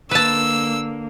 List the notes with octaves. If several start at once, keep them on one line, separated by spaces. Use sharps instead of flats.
D3 A#3 B4 A5 E6